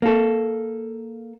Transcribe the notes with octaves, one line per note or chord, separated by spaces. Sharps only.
A#3 A4